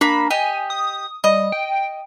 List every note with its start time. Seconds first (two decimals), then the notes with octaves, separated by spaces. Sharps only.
0.01 A#3 D4 B5
0.31 G4 D#5 G#5
0.70 D#6
1.24 G3 D#5
1.52 G5